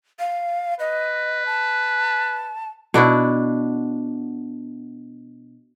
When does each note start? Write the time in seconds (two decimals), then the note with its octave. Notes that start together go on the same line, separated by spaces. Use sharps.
0.19 F5
0.80 B4 D#5
1.46 A5
2.94 B2 D4 E4 F#4